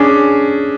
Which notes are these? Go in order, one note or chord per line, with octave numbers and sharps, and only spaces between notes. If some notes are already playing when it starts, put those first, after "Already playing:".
Already playing: C#4 D4 G#4